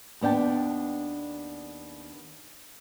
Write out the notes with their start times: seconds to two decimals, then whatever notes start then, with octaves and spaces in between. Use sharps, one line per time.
0.21 D#2 B3 D4 G5 A5